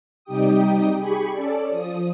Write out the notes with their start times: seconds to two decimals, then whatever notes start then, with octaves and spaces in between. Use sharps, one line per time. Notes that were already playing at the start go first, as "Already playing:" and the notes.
0.24 C3 G3 D#4 G4 G5 D#6
0.97 G4 G#4 B5 C#6
1.32 C#4 A4 D5
1.69 F3 D#6